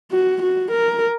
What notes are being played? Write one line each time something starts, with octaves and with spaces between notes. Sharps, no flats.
F#4
F#4
A#4